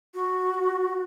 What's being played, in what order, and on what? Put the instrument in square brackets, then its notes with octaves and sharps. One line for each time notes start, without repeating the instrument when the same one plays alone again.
[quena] F#4